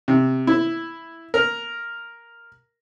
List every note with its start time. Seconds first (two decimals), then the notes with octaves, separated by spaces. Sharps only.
0.08 C3
0.47 E4
1.34 A#4